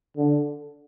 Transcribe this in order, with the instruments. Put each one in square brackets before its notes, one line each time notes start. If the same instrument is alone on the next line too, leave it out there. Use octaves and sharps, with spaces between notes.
[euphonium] D3